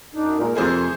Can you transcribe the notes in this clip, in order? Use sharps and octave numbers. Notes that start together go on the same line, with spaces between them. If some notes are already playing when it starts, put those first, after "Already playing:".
F#2 D4 D#4
A#2 G#3 A#4
F2 C3 A3 G#4 C5